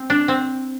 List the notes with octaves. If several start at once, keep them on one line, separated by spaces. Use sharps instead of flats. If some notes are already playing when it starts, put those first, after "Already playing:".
Already playing: C4
D4
C4